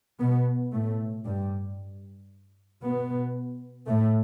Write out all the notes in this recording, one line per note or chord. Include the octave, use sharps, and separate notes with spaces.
B2 B3
A2 A3
G2 G3
B2 B3
A2 A3